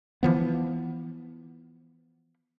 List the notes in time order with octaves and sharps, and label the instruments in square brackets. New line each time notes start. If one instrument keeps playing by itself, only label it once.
[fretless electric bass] E3 F3 B3